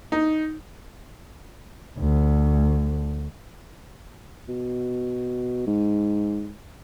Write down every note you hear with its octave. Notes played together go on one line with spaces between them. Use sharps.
D#4
D2
B2
G#2